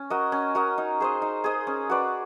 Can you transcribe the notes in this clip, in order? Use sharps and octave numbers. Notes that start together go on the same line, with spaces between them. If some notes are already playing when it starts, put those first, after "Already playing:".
Already playing: C#4
F#4 A#4 D#5
C#4
F#4 A#4 D#5
D#4
G#4 C5 D#5
D#4
G#4 C5 D#5
C#4
F#4 B4 D5